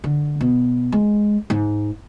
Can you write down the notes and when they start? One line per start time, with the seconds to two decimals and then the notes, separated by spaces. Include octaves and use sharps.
0.04 D3
0.41 B2
0.92 G#3
1.50 G#2